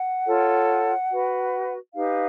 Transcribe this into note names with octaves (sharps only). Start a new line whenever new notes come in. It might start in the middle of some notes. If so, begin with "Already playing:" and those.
Already playing: F#5
F4 A4 C#5
F#4 B4
D#4 G4 B4 F5